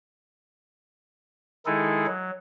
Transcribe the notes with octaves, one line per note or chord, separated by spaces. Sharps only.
D#3 G#3 D#4 E4 G#4 A4
F#3